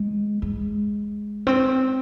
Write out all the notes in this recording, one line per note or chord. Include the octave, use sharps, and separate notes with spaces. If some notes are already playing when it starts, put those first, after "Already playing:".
Already playing: G#3
G#3
C4